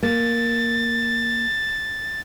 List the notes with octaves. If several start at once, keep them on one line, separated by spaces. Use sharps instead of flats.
A#3 A6